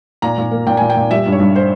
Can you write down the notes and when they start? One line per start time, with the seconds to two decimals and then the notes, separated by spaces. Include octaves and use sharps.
0.22 A#2 A#5
0.38 A#2
0.51 A#3
0.67 A#2 G5
0.77 A#2 G#5
0.90 G5
0.97 A#2
1.11 G3 E5
1.26 G2
1.32 C#5
1.40 G2
1.56 C5